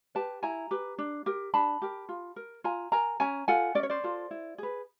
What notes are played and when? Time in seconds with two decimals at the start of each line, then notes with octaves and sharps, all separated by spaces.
0.15 G4 B4 G5 A5
0.43 E4 G#5 A#5
0.71 G4 B4
0.98 D4
1.26 G4 A#4
1.54 D4 A5 B5
1.82 G4 A#4
2.09 F4
2.36 A#4
2.64 F4 G#5 A#5
2.92 A#4 G#5 A#5
3.20 C#4 G#5 A#5
3.48 F4 A4 F#5 G#5
3.75 C#4 D5
3.83 C#5
3.90 C5 D5
4.03 F4 A4
4.31 E4
4.58 G#4 B4